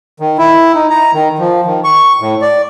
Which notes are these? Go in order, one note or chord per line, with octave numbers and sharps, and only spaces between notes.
D#3
E4
D#4
A#5
D#3
F3
D#3
C#6
A2
D5